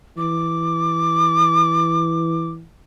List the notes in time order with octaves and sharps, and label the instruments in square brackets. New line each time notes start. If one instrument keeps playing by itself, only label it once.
[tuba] E3 [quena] D6